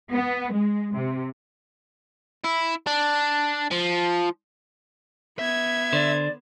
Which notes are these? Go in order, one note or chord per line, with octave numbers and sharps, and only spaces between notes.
B3
G#3
C3
E4
D4
F3
B3 E5 G#6
D3 C5 D5